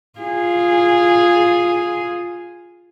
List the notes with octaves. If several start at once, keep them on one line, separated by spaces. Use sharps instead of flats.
F4 G#4